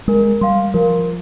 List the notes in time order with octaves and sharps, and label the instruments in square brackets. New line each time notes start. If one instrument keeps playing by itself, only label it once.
[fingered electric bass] G#3 [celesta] A#4
[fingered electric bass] G3 [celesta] F5 C6
[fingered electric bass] F3 [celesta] A#4